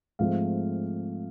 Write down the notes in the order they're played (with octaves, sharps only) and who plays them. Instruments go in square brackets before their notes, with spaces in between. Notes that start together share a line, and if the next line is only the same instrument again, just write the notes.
[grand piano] G#2 F3 A3 C4 F5